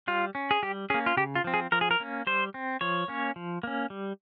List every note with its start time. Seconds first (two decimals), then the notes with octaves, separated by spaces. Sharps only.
0.08 G3 F4
0.35 C#4
0.51 G#4
0.63 G3 G4
0.90 C#4 G#4
0.94 A#3
1.06 F4
1.17 C#3 G4
1.35 F4
1.44 F3 C4
1.54 G#4
1.72 F3 A#4
1.81 G#4
1.91 A#4
2.00 A#3 C#4
2.27 G3 C5
2.54 C4
2.81 F3 C#5
3.08 A#3 C#4
3.36 F3
3.63 A#3 C#4
3.90 G3